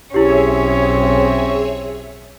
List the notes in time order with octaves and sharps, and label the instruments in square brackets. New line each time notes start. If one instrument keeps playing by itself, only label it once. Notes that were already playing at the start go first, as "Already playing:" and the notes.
[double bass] B1 C4 [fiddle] C#4 [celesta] E4 G4 [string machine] G#4 C#5 E5